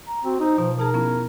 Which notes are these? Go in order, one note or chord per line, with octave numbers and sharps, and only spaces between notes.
A#5
C4 F#4
D#4 C5
B2 F3 A#5
B2 D#4 G#4 A#4 A5
F3 B3 C#4 E4